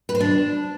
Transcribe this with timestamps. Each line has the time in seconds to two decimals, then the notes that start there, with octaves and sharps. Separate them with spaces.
0.09 B4
0.15 C5
0.21 D4